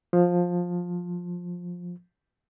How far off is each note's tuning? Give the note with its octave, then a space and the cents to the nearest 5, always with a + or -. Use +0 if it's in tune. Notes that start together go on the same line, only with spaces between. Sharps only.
F3 +15